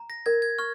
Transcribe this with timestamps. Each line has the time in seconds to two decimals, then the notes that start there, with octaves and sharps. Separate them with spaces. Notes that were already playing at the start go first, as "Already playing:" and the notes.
Already playing: A#5
0.10 A#6
0.26 A#4 G#6
0.42 G#6
0.58 C#6 F6